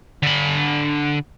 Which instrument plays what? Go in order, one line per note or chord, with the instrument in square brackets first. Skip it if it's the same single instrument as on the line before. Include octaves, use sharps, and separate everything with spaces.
[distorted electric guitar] D3 B5